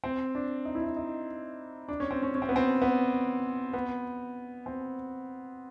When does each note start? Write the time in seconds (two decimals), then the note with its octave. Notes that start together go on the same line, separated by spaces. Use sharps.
0.04 C4
0.35 D4
0.65 D#4
0.75 E4
0.84 D#4
0.97 D#4
1.88 D4
2.00 C#4
2.11 C4
2.23 C#4
2.35 C#4
2.42 C4
2.49 B3
2.56 C4
2.82 B3
3.73 B3
4.66 C4